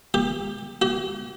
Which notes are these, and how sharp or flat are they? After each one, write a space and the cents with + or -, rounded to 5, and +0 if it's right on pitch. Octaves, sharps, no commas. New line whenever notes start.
G4 +15
G4 -40